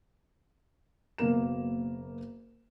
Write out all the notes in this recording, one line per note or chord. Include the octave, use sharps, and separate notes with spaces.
F#1 B2 A#3 A#4 E7